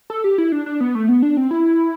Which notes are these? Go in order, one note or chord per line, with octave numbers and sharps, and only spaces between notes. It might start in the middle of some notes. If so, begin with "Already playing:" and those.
A4
G4
E4
D4
D4
B3
A3
B3
D4
C4
E4